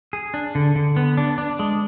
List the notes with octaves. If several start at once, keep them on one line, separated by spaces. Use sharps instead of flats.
G#4
D4
D3
D3
B3
D4
D4
G#3